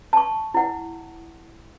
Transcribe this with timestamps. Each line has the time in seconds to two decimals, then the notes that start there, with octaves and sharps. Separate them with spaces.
0.13 A5 C#6
0.54 E4 F#5